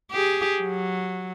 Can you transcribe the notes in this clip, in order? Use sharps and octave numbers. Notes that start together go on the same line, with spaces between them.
G4 G#4
F#3